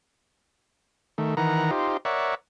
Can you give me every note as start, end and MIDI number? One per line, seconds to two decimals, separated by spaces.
1.18 1.35 51
1.18 1.35 57
1.37 1.71 51
1.37 1.71 52
1.37 1.71 70
1.37 1.71 78
1.37 1.71 82
1.71 1.97 63
1.71 1.97 65
1.71 1.97 67
1.71 1.97 72
2.05 2.35 70
2.05 2.35 73
2.05 2.35 74
2.05 2.35 76
2.05 2.35 78